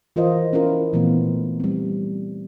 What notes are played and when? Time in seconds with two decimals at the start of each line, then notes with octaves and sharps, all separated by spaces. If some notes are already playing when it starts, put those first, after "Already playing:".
0.16 E3 F4 A#4 C5 D#5
0.53 C#4 E4 F4 A#4
0.93 A#2 E3 A3 B3
1.60 G3 C4